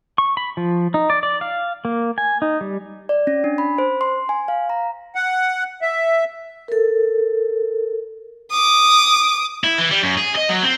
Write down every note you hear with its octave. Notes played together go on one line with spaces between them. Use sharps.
C#6
B5
F3
D#4
D5
D5
F5
A#3
G#5
D#4
G3
D5
C#4
D4
B5
C5
C6
G#5
F5
A#5
F#5
E5
A4 A#4
D6 D#6
E4
E3
G3
F#2
G#4
D#5
F#3
C4